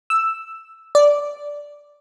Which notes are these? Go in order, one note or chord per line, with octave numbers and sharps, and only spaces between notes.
E6
D5